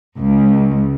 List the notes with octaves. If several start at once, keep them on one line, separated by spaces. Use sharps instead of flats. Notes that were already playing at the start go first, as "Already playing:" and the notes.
C#2